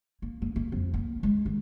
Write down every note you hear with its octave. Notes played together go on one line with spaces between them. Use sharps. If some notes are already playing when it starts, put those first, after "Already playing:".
A#3
A#3
A#3
F2
A#3
G#3
D#3